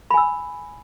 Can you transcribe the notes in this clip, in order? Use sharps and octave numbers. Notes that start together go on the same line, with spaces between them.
G#5 B5 E6